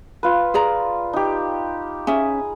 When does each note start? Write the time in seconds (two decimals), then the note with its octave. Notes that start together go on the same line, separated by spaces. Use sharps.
0.23 F4 B4
0.54 G#4 D5 A#5
1.13 D#4 G4
2.07 C#4 G#4 E5